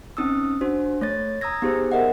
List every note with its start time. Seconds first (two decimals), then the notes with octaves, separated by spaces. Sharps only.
0.17 C4 C#4 D#4 D#6 E6
0.61 D4 F#4 C5
1.01 A3 C#5 A6
1.41 A#5 D#6 E6 G#6 A#6
1.62 B3 D#4 G4 G#4 C5
1.92 B3 D#4 A#4 D#5 E5 F#5